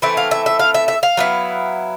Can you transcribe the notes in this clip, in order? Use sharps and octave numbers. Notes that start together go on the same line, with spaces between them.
E3 A3 C4 E5
F5
E5
E5
F5
E5
E5
F5
F#3 B3 E4